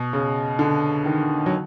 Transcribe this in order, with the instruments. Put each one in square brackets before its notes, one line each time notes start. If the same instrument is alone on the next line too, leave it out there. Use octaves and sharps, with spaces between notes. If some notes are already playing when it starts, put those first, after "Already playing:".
Already playing: [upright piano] B2
C#3
D3
D#3
F#3